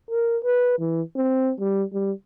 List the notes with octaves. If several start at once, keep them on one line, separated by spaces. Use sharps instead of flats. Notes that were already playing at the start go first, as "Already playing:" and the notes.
A#4
B4
E3
C4
G3
G3